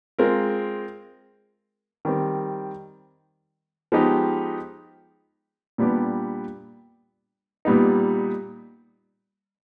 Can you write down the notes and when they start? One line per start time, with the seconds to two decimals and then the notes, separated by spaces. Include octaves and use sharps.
0.19 G#3 C4 F4 A#4
2.05 D#3 G3 C4
3.92 F3 G#3 B3 D#4 G4
5.78 A#2 G3 B3 D4 G4
7.65 A#2 G3 B3 D#4